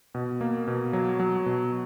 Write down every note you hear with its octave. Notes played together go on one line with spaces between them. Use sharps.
B2
A#3
B2
F#3
F#3
B2